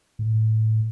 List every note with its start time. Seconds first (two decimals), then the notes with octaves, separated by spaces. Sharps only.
0.19 A2